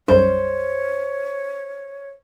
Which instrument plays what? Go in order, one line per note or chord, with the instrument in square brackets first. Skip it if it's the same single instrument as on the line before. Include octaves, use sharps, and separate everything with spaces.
[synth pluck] B1 F#2 G3 [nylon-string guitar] C5 [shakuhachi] C#5